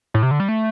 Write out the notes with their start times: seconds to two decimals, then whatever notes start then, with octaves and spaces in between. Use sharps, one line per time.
0.14 A2
0.23 C3
0.31 D3
0.40 G3
0.48 A3